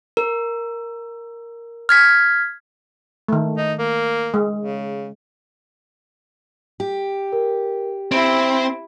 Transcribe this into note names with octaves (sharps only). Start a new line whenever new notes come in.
A#4
F6 G#6 B6
D#3 A3
D#4
A#3
G#3
C#3
G4
A#4
C4 E4 D7